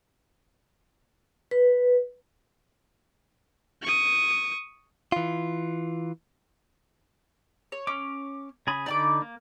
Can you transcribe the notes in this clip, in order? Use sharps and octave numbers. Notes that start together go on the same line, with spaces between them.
B4
C#6 D#6
E3 F4
C#5
C#4 D6
C#3 G#4 B5
D3 D#4 D5 B5 D6
A#3